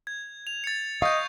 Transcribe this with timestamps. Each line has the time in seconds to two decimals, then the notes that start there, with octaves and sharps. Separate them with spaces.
0.07 G#6
0.47 F7
0.64 A6 C#7
1.02 D#5 F5 C#6 G6